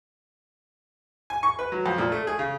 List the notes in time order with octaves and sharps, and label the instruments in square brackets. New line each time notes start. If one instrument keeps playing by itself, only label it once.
[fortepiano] G#5
C#6
B4
F#3
F2
A#2
A3
G#4
C#3